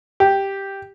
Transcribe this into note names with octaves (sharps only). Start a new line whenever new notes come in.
G4